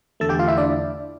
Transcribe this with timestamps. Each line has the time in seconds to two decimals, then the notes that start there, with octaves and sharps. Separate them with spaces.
0.20 E2 D3 A3 A4 A5
0.29 G4 G5
0.39 F4 F5
0.48 E4 E5
0.57 D4 D5